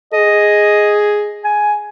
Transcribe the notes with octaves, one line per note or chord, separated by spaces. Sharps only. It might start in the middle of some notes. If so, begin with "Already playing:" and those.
G#4 D#5
G#5